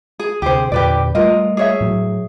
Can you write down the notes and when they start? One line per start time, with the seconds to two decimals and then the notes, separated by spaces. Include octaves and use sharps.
0.20 G#4
0.42 D2 C3 G4 G#4 C5
0.72 E2 A#2 D3 G4 B4 D5
1.15 G3 A3 F4 A#4 D#5
1.57 G#4 C#5 E5
1.80 A2 F#3